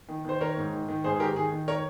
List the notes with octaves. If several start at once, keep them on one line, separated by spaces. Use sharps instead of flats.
D#3
D#3 C5
D#3 A#4 C#5
G#2
D#3
D#3
G#2 G#4 C5
G#4
D#3 G4 A#4
D#3 G#4
D#3
A#4 C#5